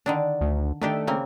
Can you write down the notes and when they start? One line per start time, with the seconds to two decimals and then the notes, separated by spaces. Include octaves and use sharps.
0.06 D3 D#3 D4
0.41 D2
0.82 D#3 A3 D4 G4
1.07 C#3 A#3 C4